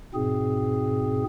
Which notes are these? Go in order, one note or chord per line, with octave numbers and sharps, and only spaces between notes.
G#2 B2 C4 G#4